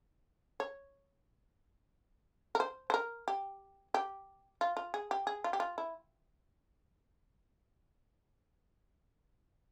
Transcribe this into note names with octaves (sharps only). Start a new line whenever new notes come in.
C#5
A#4
C5
C5
A#4
G4
G4
F4
F4
G#4
G4
G#4
F4
G4
F4
E4